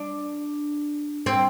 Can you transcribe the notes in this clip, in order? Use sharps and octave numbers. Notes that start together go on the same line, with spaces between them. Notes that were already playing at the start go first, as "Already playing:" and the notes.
Already playing: D4
C4